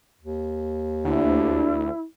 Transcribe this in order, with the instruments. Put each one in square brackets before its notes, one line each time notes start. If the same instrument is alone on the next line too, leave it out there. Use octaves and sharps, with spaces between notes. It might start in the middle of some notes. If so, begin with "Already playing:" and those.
[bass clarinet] D#2
[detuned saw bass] D2 [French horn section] D4 [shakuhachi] E4